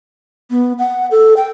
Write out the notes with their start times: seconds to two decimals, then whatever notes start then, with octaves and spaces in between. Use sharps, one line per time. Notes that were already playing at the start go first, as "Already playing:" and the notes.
0.51 B3
0.79 F#5
1.11 A4
1.37 G5